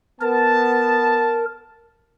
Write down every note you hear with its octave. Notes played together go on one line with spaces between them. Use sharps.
B3 A#4 A5